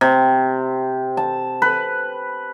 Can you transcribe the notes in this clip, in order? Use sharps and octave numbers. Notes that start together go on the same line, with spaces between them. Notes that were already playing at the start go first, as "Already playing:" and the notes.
C3
A5
B4